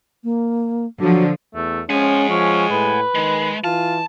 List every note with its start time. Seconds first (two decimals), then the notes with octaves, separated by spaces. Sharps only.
0.24 A#3
0.99 D3 F3 F#3
1.55 E2 A3
1.90 F3 G#3 C#4 F#5 G#5
2.30 F3 C#4
2.71 A2 B4
3.15 D#3 G#3
3.64 E3 F4 A5